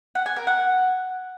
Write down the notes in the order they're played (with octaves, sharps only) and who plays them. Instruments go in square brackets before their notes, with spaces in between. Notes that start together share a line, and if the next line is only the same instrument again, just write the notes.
[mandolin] F#5
G#5
A#4
F#5